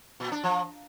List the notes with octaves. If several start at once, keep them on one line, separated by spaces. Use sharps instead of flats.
A#2
D4
F3